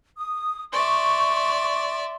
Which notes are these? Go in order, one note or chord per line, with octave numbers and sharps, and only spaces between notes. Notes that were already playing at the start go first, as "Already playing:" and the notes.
D#6
D5 E5 C6 C#6